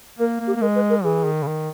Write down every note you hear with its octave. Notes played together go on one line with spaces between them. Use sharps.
A#3 A#4
A#3
G4
A#3
G#3 A#4
B4
A#4
E3 G#4
D#3
C#3
D#3